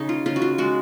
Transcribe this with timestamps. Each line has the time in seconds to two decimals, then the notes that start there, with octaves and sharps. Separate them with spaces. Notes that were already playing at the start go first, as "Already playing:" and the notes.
Already playing: C#3 D#4
0.09 F4
0.26 C#3 F4
0.36 F#4
0.42 F4
0.58 G#3 F#4